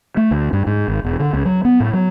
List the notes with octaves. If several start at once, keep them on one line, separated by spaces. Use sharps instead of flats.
A3
D2
G2
G#2
G#1
E1
D3
C#2
F#3
B3
A2
F#3